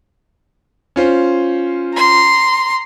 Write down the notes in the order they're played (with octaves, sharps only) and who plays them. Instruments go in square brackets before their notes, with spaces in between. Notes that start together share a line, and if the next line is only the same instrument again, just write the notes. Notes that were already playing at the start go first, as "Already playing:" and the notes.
[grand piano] C#4 F4 C5
[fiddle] A#5 C6